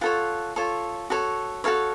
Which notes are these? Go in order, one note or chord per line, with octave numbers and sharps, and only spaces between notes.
F4 A4 C#5 F#5
F4 A4 C#5
F#4 A4 C#5
F#4 A4 C#5 F5